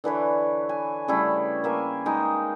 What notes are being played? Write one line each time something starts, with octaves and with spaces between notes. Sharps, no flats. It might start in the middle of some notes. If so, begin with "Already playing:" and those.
D3 E3 B4 C#5
G#5
C#3 G3 A3 E4
A#3 E5 G#5
G#3 D#4 G5